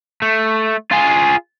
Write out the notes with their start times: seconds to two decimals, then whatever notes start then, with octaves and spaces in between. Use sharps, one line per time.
0.22 A3
0.91 F4 G#4